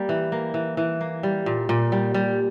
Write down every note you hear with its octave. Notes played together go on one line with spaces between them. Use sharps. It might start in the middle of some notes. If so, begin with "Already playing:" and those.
Already playing: G3 A#3
E3
A#3
E3
E3
A#3
G3
A#2
A#2
G3
G3